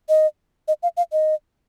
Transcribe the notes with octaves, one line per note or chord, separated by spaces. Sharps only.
D#5
D#5
F5
F5
D#5